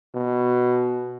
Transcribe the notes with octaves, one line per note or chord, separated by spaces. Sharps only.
B2